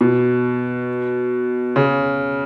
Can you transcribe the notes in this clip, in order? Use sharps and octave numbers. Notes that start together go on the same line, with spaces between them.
B2
C#3